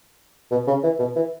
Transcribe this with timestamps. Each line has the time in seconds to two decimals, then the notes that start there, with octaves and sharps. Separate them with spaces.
0.52 B2
0.67 C#3
0.84 E3
0.99 B2
1.16 E3